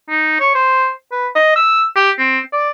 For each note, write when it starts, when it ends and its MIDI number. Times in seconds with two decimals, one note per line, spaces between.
0.09 0.36 63
0.40 0.51 73
0.55 0.90 72
1.12 1.27 71
1.35 1.56 75
1.56 1.85 88
1.96 2.11 67
2.18 2.39 60
2.53 2.70 74